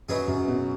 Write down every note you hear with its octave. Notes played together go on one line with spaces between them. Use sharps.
F#2 F#3 B3 D#4 G#4
F#2
B2